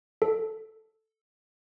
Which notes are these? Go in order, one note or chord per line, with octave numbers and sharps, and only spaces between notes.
A4